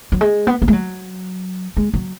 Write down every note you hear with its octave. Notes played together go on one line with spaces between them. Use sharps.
F#3
G#3
B3
B3
G#3
F#3
G#3
F#3